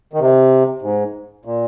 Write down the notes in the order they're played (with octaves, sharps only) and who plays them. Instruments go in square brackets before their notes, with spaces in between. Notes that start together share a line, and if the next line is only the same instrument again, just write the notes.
[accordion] D#3
C3
G#2
A#2